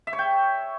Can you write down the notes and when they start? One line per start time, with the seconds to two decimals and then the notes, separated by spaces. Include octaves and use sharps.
0.07 E5
0.13 C#5
0.19 G5